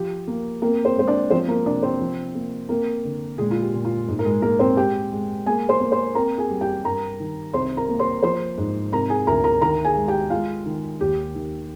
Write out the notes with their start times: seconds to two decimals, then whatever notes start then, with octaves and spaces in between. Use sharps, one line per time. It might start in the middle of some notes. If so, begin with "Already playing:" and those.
Already playing: F3 G4
0.27 A#3
0.62 A#3 C4 A#4
0.85 C4 C5
0.96 G#3 C5
1.08 D4 D5
1.30 F3 C4 C5
1.48 A#3 A#4
1.65 C3 D4 D5
1.83 C4 C5
2.01 F3
2.35 A#3
2.69 A#3 C4 A#4
3.04 D3
3.38 A#2 G#3 G#4
3.51 F4
3.62 G4
3.74 A#2
3.85 F4
4.08 G#2
4.19 A#4
4.25 G#3 G#4
4.42 G#3 A#3 A#4
4.59 C4 C5
4.77 G#3 G4 G5
5.12 G#3
5.46 A#3 G#4 G#5
5.69 C5 C6
5.81 A#3
5.92 C5 C6
6.15 C4 A#4 A#5
6.38 G#4 G#5
6.49 G3
6.61 G4 G5
6.84 G2 A#4 A#5
7.20 D#3
7.54 C2 C5 C6
7.77 A#4 A#5
7.89 A#3
7.99 C5 C6
8.23 F3 C5 C6
8.58 G#2
8.92 C3 A#4 A#5
9.10 G#4 G#5
9.27 D2 A#4 A#5
9.44 A#4 A#5
9.61 D#3 A#4 A#5
9.84 G#4 G#5
9.96 G#3
10.08 G4 G5
10.30 G#3 F4 F5
10.66 D#3
11.00 D#2 G4
11.35 D#3